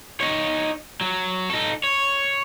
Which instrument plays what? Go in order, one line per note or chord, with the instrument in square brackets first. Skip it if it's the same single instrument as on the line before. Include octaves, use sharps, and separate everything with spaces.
[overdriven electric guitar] D#4 C#5
F#3
D#4 A4
C#5